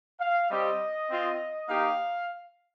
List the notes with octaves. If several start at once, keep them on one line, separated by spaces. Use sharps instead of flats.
F5
G3 C4 G4 D#5
C4 F4
A#3 D#4 G4 F5